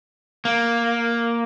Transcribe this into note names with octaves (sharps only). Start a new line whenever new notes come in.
A#3